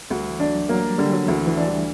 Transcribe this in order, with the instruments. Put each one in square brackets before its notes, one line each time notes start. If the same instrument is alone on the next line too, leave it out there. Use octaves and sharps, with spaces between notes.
[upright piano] D2 [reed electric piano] G3
[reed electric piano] E3
[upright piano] D4
[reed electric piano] F#3
[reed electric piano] F#3 [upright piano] A#3
[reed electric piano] G3
[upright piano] D3 [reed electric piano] G3
[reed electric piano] F#3
[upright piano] D2 [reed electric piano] E3
[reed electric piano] E3
[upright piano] D4
[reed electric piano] G3